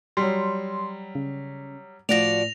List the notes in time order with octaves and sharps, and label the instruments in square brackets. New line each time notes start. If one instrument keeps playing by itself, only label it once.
[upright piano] F#3 G3 [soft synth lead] C6
[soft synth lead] C#3
[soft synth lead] A2 [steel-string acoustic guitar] F3 F#4 D5 [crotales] A#6 F7